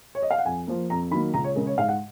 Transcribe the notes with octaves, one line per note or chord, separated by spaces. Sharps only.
C#5
D#5
F5
F#5
F2 G#5
F3 A#3
F2 A#5
D#3 F#3 A#3 B5
C#2 A#5
C#5
C#3 G#3 A#4
C#5
G#2 F5
F#5